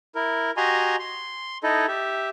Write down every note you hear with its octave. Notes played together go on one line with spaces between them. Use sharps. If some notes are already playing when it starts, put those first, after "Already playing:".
E4 A#4
F#4 G4 D#5 G#5 A#5 C6
C6
D#4 E4 A4 D#5
G4 E5